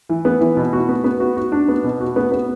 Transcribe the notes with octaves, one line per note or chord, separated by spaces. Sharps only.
E3
B3
E3
B2
F#4
B3
B3
F#4
F#4
D4
B3
B2
F#4
B3
B3